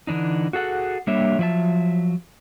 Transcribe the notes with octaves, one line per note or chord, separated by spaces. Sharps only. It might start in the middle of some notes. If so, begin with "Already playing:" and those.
D3 E3 D4 D#4
F#4 G#4 A4 F#5
G3 A#3 D4 G4 C#5 E5
F3 F#3 D5 E5 A5